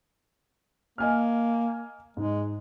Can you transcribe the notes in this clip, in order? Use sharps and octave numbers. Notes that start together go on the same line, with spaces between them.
A#3 D#5 G#5 F6
G#2 G#3